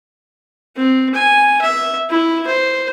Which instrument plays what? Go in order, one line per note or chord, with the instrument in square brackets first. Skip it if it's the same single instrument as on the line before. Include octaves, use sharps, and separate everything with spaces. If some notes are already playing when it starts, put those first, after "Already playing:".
[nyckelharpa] C4
G#5
E5
E4
C5